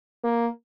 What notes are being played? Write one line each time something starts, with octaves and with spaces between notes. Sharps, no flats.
A#3